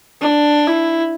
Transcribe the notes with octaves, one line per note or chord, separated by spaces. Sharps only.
D4
E4